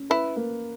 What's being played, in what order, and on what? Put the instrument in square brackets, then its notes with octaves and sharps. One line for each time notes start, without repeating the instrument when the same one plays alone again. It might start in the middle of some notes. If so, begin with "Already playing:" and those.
Already playing: [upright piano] C#4
[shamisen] E4 [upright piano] B4
[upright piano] A#3